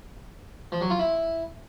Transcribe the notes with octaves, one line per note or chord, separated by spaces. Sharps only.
F3
F#3
F4
E4